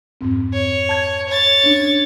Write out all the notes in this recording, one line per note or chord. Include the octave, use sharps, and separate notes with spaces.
F2 G#2 C4
C#5
A5 G#6
C#5 A6
C#4 D4